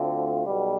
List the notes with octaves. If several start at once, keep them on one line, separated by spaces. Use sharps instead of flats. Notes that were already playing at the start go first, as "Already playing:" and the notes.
Already playing: D2 D3 A3 C4 F4
B1 B2 G3